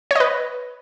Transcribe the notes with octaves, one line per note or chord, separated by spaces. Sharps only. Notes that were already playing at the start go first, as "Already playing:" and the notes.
B4 C#5 D#5